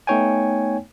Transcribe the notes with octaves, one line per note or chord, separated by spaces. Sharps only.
A3 B3 D#4 C#5 G5 G#5